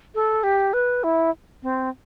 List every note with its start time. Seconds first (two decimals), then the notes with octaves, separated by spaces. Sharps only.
0.15 A4
0.43 G4
0.73 B4
1.04 E4
1.63 C4